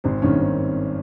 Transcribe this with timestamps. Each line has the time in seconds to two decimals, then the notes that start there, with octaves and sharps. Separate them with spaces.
0.04 G#1 C4
0.22 G2 D#3 A#3 C#4
0.41 C4